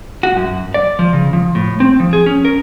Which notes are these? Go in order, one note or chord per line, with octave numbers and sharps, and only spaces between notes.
F#4
F#2
D5
F3
C#3
F3
A2
C4
F3
G#4
C#4
A#4